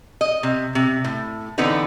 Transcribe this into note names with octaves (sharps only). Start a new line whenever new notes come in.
D#5
C3
C3
A2
D3 E3 B3 C4 D#4 B4